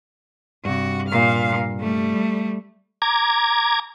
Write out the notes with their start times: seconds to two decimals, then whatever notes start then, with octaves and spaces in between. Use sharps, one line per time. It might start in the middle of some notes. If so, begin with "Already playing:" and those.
0.65 G2 C3 F#4
1.08 A#2 F5
1.80 G3 A3
3.02 A#5 D6 G#6